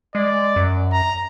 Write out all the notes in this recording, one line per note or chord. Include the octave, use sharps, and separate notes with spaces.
G#3 D5
F#2
A#5